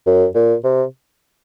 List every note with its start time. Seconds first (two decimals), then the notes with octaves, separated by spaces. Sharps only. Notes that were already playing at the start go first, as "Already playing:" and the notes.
0.06 F#2
0.35 A#2
0.64 C3